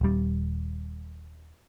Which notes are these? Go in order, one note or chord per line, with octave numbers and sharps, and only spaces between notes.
D#1 G3